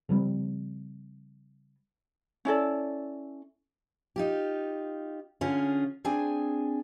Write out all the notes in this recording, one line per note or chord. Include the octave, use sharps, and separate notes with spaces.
C#3 F3 G3 C4
C#4 E4 A4 D5
D#4 F4 G4
D3 C#4 F4 G#4
C4 D4 G#4 G#5